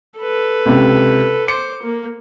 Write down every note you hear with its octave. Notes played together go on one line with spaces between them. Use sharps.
A4 B4
C#2 C3
C5 D6 C#7
A#3